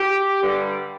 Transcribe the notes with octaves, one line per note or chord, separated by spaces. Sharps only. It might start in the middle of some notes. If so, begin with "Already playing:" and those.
Already playing: G4
G2 D3 G3